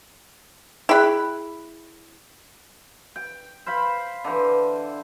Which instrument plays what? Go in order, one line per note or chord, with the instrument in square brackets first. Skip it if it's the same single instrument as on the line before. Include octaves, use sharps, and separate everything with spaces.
[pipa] E4 B5 [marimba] G#4 G5 F#6
[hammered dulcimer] G5
C5 F5 B5
D3 E3 C5